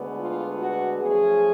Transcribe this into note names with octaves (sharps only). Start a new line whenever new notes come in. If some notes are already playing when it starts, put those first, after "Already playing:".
Already playing: D2 D3 G#3 B3
F4
F#4
F#2 F3 A3 C#4 G#4